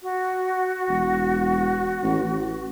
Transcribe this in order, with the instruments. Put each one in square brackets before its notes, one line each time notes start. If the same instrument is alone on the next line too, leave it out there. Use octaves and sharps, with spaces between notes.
[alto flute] F#4
[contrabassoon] E1
A1
A1